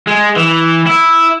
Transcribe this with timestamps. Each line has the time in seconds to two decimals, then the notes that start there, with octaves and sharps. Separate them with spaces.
0.07 G#3
0.37 E3
0.87 E4